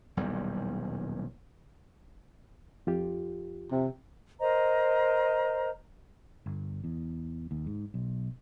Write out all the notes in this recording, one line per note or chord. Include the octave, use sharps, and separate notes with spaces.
D#1 B1 E2 G3
F2 F4 G4
C3
A#4 C5 D#5 A#5
G1
E2
D#2
G#2
B1